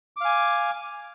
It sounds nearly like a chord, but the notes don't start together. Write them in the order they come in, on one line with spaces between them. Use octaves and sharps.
D6 F5 G#5